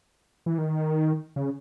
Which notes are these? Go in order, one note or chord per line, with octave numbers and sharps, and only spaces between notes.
E3
D#3
C#3